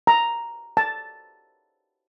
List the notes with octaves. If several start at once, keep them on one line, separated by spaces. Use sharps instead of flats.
A#5
A5